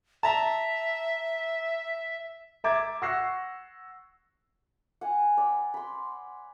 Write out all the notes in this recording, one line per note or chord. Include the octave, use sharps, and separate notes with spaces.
E5 A5 A#5
E5 A#5 D6 G#6 A6
F#5 C#6 E6 F#6 A#6 C7
F#5 G#5
D5 B5
B5 C6